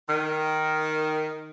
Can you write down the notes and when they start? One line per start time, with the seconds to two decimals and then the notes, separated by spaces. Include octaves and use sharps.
0.09 D#3